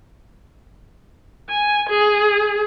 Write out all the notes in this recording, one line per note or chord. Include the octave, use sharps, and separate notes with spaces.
G#5
G#4